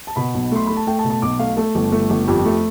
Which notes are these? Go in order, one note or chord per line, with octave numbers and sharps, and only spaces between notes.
A5
B2 B5
B1
A3 C6
A3 B5
A5
A3 G5
A5
B2
A5
B1 D6
A3 F5
A3 A4
G1
A3
G1
F2 G4
A3